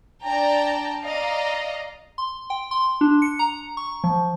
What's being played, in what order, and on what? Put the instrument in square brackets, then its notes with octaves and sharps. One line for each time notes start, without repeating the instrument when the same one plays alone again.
[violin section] D4 D5 G5 A5 A#5
D5 D#5 F5 A#5
[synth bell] C6
G5
C6
D4
C#7
A#5
C#6
F3